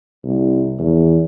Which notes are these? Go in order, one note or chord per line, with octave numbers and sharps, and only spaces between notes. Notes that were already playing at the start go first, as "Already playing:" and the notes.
C2
E2